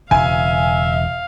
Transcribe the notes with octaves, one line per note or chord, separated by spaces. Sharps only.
E1 C#3 E5 F5 G#5